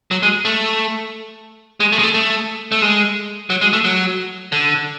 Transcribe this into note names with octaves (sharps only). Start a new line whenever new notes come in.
F#3
G#3
A3
G#3
A3
G#3
A3
A3
A3
G#3
F#3
G#3
A3
F#3
D3